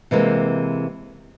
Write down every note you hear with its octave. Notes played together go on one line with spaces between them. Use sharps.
C3 E3 G#3 A#3 C4